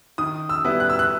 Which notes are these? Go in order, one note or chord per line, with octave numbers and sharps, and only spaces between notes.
D#3 D#6
E6
G3 B3 E4
F#6
E6
F#6